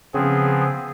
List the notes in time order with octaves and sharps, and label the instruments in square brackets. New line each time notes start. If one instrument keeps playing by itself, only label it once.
[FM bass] C#3 [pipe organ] F3 B3 C4 [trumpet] G#4